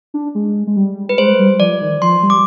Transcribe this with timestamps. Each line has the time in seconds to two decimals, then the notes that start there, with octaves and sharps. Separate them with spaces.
0.14 D4
0.35 G#3
0.67 G#3
0.76 G3
1.09 B4
1.18 G#3 C5
1.39 G3
1.60 F3 D5
1.81 D#3
2.02 F3 C6
2.23 G3
2.30 D6